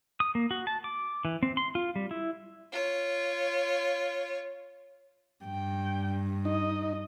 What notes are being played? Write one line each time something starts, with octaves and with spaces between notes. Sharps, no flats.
D#6
A#3
F#4
A5
D6
E3
C4
C6
F4
G3
E4
F4 C#5
G2 G5
D#4 D#5